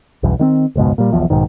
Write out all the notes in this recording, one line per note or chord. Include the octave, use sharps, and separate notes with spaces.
B1 E2 G2
D#3 B3 C4
F#1 C#2 G#2 B2
A#2 G3
E1 B1 E2 F3
B1 G#2 D#3